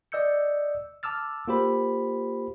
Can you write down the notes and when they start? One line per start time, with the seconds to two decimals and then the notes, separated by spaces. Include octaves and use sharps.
0.12 D5 D#5 E6 G6 C#7
1.03 A5 D6 E6 F6 A6
1.47 A#3 F4 G4 C5 B5